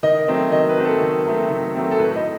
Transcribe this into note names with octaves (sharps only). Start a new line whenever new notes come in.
D#3 D#5
F#3 A3 C4
D#3 D#5
B4
F#3 A3 C4
A4
D#3
F#3 A3 C4
D#3
F#3 A3 C4
A4
A2 B4
D#5